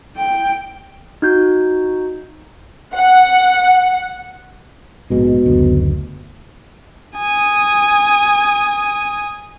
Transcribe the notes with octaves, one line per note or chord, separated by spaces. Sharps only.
G5
D#4 F#4 G6
F#5
A#1 G#2 B2 G#3
F#1 D2
G#5 D#6